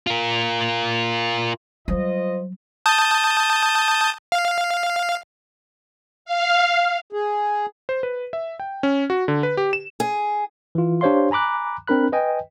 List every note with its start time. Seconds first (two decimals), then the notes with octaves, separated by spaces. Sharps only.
0.07 F4 A#4
1.88 F#3 G3 F4 C5 D#5
2.86 A5 D#6 G6
4.32 F5
6.25 F5
7.13 G#4
7.89 C5
8.03 B4
8.33 E5
8.60 G5
8.83 C#4
9.10 F#4
9.28 D3
9.43 B4
9.57 G4
9.73 E7
10.00 G#4
10.75 E3 F4
11.01 D4 G4 C5 C#5 F5 C6
11.31 G#5 A#5 B5 D6 F#6
11.87 C4 D4 A#4 B5 F#6
12.12 B4 D#5 G5 G#5